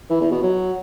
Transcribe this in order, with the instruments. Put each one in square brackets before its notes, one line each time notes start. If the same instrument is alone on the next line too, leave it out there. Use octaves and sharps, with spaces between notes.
[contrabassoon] E3
E2
B2
F#3